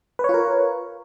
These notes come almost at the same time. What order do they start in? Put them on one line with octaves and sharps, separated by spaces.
B4 C#5 F4 A#4